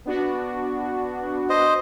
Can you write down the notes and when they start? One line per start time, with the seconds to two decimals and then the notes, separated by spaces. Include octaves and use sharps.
0.05 B3 D4 F#4
1.50 C5 D#5